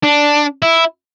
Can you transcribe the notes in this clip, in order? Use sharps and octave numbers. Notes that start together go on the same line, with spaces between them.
D4
E4